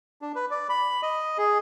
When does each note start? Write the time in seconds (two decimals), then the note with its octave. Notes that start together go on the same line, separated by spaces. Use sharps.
0.22 D4
0.35 B4
0.51 D5
0.69 B5
1.02 D#5
1.38 G#4